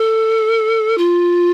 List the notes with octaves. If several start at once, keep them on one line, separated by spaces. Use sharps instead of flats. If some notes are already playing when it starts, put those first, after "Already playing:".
Already playing: A4
F4